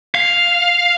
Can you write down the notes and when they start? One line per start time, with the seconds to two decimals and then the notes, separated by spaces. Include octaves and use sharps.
0.15 F5